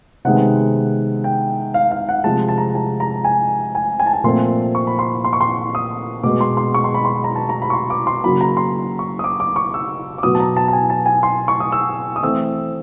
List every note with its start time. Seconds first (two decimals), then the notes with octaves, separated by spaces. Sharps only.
0.25 C3 D#3 G#3 B3 F#5
1.24 G5
1.74 F5
1.91 F5
2.09 F#5
2.24 C3 F3 G#3 A5
2.49 A5
2.58 A#5
2.75 A5
3.00 A#5
3.24 G#5
3.75 G#5
4.00 G#5
4.06 A5
4.13 G#5
4.24 A#2 F3 A3 C4 C6
4.75 C#6
4.87 B5
4.99 C6
5.24 C6
5.33 C#6
5.41 C6
5.75 D#6
6.23 B2 G#3 B3 D6
6.41 C6
6.57 C6
6.74 C#6
6.84 C6
6.94 B5
7.05 C6
7.24 A#5
7.36 A5
7.49 A#5
7.62 B5
7.70 C#6
7.73 C6
7.90 D6
8.07 C6
8.24 C#3 F#3 A#3 B5
8.41 A#5
8.57 C6
8.99 C#6
9.19 D#6
9.24 D6
9.40 D6
9.56 C#6
9.74 E6
10.18 D6
10.23 B2 F#3 B3 D#6
10.35 A5
10.40 A#5
10.57 A5
10.68 A5
10.73 G#5
10.90 A5
11.06 G#5
11.23 C6
11.48 C#6
11.60 D#6
11.72 E6
12.16 D#6
12.23 E3 A3 C4 E6